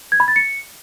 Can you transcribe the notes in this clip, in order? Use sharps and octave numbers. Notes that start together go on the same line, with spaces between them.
G#6
B5
A6
C#7